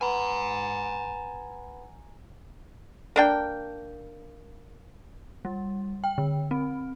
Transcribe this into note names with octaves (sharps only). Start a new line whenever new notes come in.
B4 F#5 G#5 A#5 B5
A#3 D4 G5
G3
G5
D3
C4